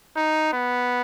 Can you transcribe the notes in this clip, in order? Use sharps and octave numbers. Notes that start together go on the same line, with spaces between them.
D#4
B3